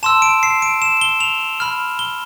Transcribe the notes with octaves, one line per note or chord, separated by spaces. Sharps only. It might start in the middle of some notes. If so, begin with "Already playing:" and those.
A5 C6 E6 E7
D7
C7
D7
E7
G7
F7
B5 F6
G7